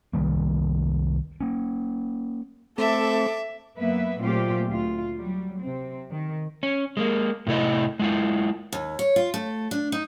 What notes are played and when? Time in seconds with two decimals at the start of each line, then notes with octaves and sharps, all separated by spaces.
0.13 C2 D#3 G3 A#3
1.41 A#3 C#4
2.78 A3 C4 A4 E5 D6
3.78 F#2 A#3 B3 B4 E5
4.20 A#2 F#3 A3 C4 F4 G4
4.66 D2 F4
5.16 F#3 G3
5.61 C3 C4
6.11 D#3
6.63 C#4
6.97 G#3 A#3
7.47 A2 C3 A3 E4 D#5
7.99 G#3 E4 F4
8.72 D#2
8.99 C#5
9.16 F4
9.34 A3
9.71 D4
9.92 D#4